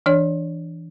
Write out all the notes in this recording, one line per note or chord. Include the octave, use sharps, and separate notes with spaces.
E3 D4 C#5